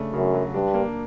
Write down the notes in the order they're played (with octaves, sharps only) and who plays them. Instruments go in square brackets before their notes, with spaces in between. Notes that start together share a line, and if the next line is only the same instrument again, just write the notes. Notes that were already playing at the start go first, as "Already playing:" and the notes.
Already playing: [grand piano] C#3 A3 D4
[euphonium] F#2 [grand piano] C#3
[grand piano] F#3
[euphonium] G2 [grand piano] D4
[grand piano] A#3